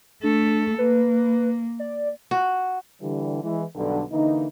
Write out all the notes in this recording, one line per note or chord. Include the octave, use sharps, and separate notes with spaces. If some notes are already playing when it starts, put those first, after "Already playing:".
A3 D4 A4
A#3 B4
D5
F#4
D3 E3 G3
E3 G#3
B1 G2 D3
D3 E3 A#3 D#4